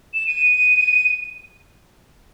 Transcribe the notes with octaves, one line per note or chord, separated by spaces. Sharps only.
E7
D#7